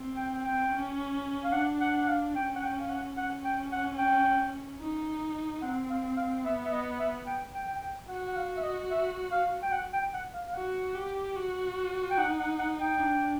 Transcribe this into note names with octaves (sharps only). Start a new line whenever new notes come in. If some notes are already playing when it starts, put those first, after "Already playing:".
Already playing: C4
G5
G5
G5
C#4
F5
D4 F#5
F#5
F#5
F5
C#4 G5
F#5
G5
F5
F#5
C#4 F#5
G5
F#5
G5
D#4
C4 F#5
F5
F5
B3 E5
E5
D#5
E5
G5
G5
G5
G5
F#4 F#5
F#5
F5
E5
D#5
E5
F5
G5
F#5
G5
F#5
F5
F5
F#4 F#5
G4
F#4
G5
D#4 F#5
F#5
F#5
G5
D4